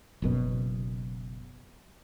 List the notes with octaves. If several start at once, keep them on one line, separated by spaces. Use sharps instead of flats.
F#1 F#2 B2